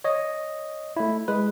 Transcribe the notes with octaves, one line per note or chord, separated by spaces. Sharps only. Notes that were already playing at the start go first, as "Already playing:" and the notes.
C#5 D#5
A3 E4
G#3 B4